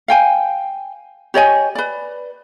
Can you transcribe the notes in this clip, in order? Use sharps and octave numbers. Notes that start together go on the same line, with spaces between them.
F5 G5 G#5
G4 C#5 D#5 G#5
B4 D5